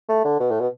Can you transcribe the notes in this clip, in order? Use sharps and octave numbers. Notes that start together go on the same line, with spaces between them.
A3
D3
B2
A2
B2